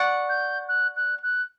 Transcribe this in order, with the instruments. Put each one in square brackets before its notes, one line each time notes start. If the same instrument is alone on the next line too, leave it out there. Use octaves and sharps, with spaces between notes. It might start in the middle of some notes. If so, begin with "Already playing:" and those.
Already playing: [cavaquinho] D5 F#5 C#6
[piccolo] G6
F#6
F#6
F#6